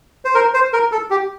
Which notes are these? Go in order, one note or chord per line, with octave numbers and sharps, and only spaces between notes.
C5
A#4
C5
A#4
A4
G4